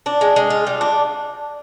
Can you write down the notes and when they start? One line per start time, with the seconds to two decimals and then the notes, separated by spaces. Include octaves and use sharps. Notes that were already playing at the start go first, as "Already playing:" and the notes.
0.06 D4
0.21 G#3
0.36 G#3
0.50 F4
0.67 G3
0.81 D4